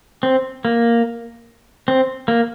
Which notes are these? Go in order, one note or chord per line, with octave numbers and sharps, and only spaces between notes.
C4
A#3
C4
A#3